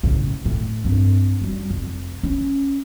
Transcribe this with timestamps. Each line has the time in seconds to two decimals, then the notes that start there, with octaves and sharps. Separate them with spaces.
0.03 A2 C#3
0.45 A2
0.84 G2 C4
1.41 F#2 G3
1.70 F1
2.23 C#4